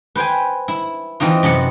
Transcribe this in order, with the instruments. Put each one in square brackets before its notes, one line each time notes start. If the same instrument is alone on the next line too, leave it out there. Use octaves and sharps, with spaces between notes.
[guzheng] B4 C5 G5 G#5
E4
E3 C4 D#4 F4
F#2 C3 B3 F#5